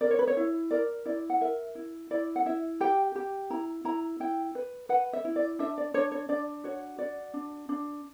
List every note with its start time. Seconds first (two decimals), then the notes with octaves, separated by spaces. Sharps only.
0.01 A#4 D5
0.11 C#5
0.19 B4
0.27 C#5
0.37 E4
0.71 A#4 D5
1.05 E4 D5
1.30 F#5
1.41 A#4 E5
1.75 E4
2.11 E4 D5
2.36 F#5
2.46 E4 E5
2.80 G4 G5
3.15 G4
3.50 E4 A#5
3.85 E4 A#5
4.20 E4 G5
4.55 B4
4.89 B4 F#5
5.13 E5
5.25 E4
5.36 D5
5.59 D4 E5
5.78 D5
5.94 D4 C#5
6.11 C#5
6.29 D4 D5
6.64 F#4 C#5
6.98 F#4 D5
7.34 D4
7.69 D4